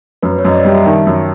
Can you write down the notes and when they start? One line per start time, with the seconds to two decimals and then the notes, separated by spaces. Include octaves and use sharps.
0.23 F#2 B4
0.39 C#5
0.45 F#2 D#5
0.55 D5
0.65 G3
0.71 E5
0.86 D#3 A5
1.07 F#2